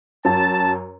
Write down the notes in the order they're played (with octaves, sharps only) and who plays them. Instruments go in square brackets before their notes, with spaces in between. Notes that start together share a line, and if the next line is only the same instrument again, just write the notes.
[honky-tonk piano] F#2 [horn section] A5